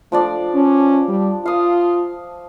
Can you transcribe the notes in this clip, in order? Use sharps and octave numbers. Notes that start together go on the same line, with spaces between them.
F3 A3 D4 D5
C#4
G3
F4 F5 D#6